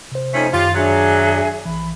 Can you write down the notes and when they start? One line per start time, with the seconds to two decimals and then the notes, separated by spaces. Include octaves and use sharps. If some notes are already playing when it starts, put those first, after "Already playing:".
0.12 C3 C5
0.34 F2 A3 C#4 D#4 G#5
0.53 F#2 D#3 F4 G4
0.74 F#3 D4 G#4 E5
1.65 A#1 E3 B5